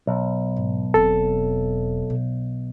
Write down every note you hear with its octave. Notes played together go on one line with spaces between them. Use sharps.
B1
G#2
E1 C4 A4
B2